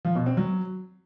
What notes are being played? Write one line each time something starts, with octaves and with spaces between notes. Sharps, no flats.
F3
B2
C4
F#3